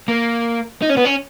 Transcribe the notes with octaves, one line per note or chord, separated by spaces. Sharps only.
A#3
D#4
C#4
B3
C#4